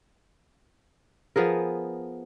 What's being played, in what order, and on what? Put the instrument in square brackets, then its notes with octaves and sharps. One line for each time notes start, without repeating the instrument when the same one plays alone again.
[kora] F3 B3 G#4 A#4